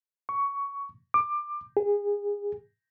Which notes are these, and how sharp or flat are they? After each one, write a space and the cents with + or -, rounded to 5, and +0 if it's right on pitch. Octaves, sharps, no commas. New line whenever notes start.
C#6 +15
D6 +20
G#4 -25